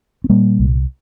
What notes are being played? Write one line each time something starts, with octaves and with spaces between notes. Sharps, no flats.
C4
A#2 G3 A#3
C2